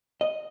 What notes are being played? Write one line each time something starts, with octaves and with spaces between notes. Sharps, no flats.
D#5